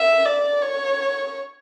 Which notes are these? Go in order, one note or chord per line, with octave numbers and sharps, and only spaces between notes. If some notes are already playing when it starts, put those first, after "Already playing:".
Already playing: E5
D5
C#5